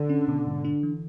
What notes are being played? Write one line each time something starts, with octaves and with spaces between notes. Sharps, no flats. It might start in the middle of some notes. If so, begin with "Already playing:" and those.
Already playing: D3
C#4
B2
G#2
D4
E3